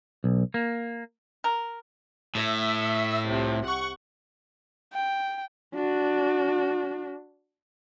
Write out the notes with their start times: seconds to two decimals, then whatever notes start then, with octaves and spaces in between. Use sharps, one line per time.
0.24 B1
0.54 A#3
1.44 A#4
2.35 A2 E5
3.25 C2 C3 F3
3.64 F#5 C#6
4.93 G5
5.75 D4 F#4